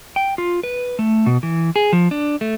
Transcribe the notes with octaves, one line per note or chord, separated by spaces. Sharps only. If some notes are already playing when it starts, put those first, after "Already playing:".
G5
F4
B4
A3
B2
E3
G#4
F3
D4
A3